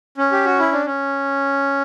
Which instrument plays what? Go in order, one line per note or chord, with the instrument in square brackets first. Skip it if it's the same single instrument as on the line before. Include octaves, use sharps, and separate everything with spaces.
[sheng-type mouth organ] C#4
G4
F#4
E4
D4
C#4